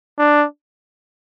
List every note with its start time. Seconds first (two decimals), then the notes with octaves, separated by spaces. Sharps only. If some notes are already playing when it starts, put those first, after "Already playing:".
0.19 D4